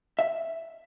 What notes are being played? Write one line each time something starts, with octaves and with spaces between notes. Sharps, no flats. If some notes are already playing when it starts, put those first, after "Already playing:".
E5